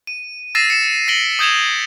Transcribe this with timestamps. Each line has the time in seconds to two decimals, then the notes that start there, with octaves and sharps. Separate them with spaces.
0.07 D#7
0.55 E6 A6 A#6 C7 D#7 E7
0.70 C#7 E7
1.08 A#6 B6 D7 F#7 G7
1.39 D#6 G6 G#6 E7 F7